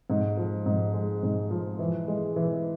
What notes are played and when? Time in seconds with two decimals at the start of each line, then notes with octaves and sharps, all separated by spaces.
0.10 G#2
0.37 F3
0.66 G#2
0.94 G#3
1.23 G#2
1.51 F3
1.79 E3
2.08 G#3
2.36 E3